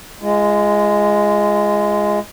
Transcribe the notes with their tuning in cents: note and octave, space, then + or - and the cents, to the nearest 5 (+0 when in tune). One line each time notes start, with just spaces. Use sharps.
G#3 +0 F4 -30